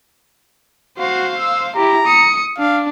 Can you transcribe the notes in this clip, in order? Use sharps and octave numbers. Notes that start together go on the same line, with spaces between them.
F#4 C5 F5
E6
E4 G4 A#5
D#6 C#7
D4 F5